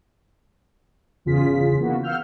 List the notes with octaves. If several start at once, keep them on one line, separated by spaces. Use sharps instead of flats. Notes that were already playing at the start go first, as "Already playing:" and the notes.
G1 E2 C#3 F4 G#4 B6
E3 A#3 B3 F#4
F5 F#5 E6 F6 G6